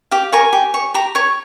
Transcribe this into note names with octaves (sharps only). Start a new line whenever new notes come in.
G4 F5
A#4 C#5 G#5
G4
C#5
G4 A#5
C#5 C#6